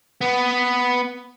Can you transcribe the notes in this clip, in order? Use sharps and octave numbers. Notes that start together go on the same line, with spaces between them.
B3